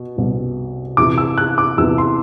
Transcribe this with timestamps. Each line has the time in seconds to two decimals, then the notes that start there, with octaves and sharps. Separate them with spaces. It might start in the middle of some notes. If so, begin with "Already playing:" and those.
Already playing: B2
0.17 C2 B2
0.97 E2 C3 E3 D6
1.18 E6
1.38 F#6
1.58 D6
1.78 E2 C3 E3 E6
1.98 C6